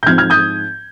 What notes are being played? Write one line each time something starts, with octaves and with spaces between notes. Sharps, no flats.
G6
G#2 F3 C4 F6 G#6
F6 G#6
D#6 G6